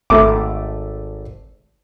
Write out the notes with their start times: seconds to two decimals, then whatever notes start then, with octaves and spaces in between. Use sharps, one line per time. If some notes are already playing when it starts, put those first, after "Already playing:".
0.10 G#1 A3 D6